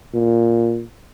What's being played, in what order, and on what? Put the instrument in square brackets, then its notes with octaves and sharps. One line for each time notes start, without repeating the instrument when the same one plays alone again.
[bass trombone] A#2